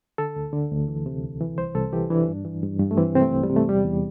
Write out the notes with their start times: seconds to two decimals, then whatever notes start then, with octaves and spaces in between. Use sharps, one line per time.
0.18 D3 A4
0.36 D2
0.53 D3
0.71 D2
0.88 E3
1.06 C3
1.23 C2
1.41 E3
1.58 C2 C5
1.75 C2 A4
1.93 E3 G4
2.10 E3 D4
2.28 G2
2.45 E3
2.63 G2
2.80 G2
2.91 A3
2.97 E3 C4
3.15 C3 C4
3.21 A3
3.32 C2
3.43 G3
3.50 C3
3.56 A3
3.68 E2 G3
3.85 E2